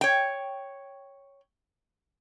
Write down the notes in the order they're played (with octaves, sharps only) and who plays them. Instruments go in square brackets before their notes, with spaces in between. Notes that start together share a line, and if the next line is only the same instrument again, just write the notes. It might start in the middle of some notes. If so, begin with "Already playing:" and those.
[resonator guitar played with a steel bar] C#5 G5